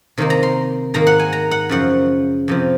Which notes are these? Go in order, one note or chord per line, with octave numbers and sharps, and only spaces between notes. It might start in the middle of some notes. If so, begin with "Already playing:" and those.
C3 D#3 A#3 D#4
A#5
C6
G#2 D#3 A#3 A#5
F#5
G#5
A#5
F#5
F#2 C#3 F3 F#5
F2 C3 F3